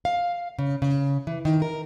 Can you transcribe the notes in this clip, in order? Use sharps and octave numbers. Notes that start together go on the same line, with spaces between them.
F5
C#3
C#3
E3
D#3
A#4